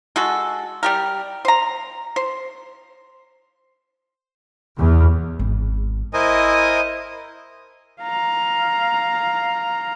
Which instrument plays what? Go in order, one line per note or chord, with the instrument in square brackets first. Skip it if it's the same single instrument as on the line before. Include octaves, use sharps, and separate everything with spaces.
[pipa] G#3 F#4 A4
G3 G4 A#4
C5 A#5
C5
[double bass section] E2
[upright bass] G#1
[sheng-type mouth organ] E4 A#4 C5 D#5 G#5 D#6
[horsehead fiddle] F5 A#5